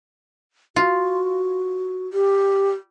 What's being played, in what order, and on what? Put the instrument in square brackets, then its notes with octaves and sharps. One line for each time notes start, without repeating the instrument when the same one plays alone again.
[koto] F4 [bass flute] F#4
[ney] G4